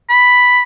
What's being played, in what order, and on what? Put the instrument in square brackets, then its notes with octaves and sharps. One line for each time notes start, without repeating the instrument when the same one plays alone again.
[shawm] B5